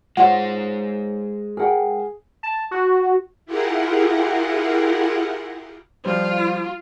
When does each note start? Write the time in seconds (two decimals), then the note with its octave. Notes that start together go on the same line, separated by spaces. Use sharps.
0.17 G#3 F4 C5 C#5 F#5
1.57 G#4 A#4 F#5 G5
2.43 A5
2.71 F#4
3.46 E4 F4 G4 G#4 A#4 F#5
6.05 F3 G3 F4 C5